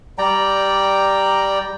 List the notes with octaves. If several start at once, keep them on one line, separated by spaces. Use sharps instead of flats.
G3 D5 G5 A#5